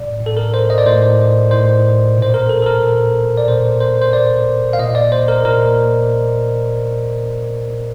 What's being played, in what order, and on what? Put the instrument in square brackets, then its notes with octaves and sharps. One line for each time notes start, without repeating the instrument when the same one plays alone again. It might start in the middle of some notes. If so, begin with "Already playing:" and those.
Already playing: [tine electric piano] A2 D5
A2
A4
A#4
C5
D#5
D5
A2 C5
A2 C5
A#2 C5
A#4
A4
A4
A#4
A#2
D5
A#2 C5
C5
C5
A#2 D5
F5
A#2 D#5
D5
C5
A#4
A#2 A#4